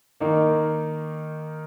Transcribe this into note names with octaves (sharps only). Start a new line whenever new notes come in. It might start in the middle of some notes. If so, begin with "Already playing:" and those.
D#3 A#3 D#4